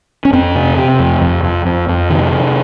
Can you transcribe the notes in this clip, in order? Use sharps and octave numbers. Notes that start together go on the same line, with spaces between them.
C#4
F2 C4
C3
C3
F2
F2
F2
F2
F2
C3 D#3
C3